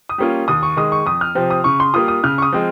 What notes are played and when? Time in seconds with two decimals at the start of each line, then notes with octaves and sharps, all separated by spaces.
0.09 D#6
0.18 G3 A#3 C#4 F4
0.48 D#2 D#6
0.63 C#6
0.76 D#3 G#3 D#6
0.92 C#6
1.06 F2 D#6
1.21 F6
1.35 C3 F3 C4
1.50 D#6
1.64 C#3 C#6
1.80 C6
1.94 G3 A#3 F4 D#6
2.08 D#6
2.23 C#3 F6
2.38 C#6
2.42 D#6
2.52 F3 G#3 C4